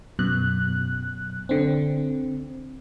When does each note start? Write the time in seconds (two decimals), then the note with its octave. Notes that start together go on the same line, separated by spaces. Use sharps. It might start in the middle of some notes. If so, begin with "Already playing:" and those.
0.19 F#2 B2 F#6
1.49 D3 C4